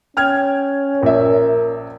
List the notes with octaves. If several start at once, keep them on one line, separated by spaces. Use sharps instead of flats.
C#4 G5 F6 G#6
A#1 A#4 E5